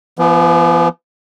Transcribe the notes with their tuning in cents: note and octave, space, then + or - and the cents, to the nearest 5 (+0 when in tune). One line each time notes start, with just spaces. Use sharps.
F3 -45 B3 +0